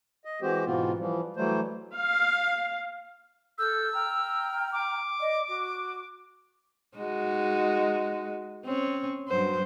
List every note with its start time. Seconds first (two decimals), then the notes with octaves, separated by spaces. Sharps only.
0.25 D#5
0.42 E3 G#3 C4 F#4 G4 C5
0.65 G#2 B2 E3 B3 C4 F4
0.98 E3 F3 G3
1.36 E3 F#3 G3 A3 C5
1.95 F5
3.58 A4 E6 F6 G6
3.93 G5 A#5 F6
4.72 D6
5.20 D5 D#5
5.48 F#4
6.98 G#3 D#4 F#4
8.65 C4 C#4 C#5
9.29 G2 F#3 C5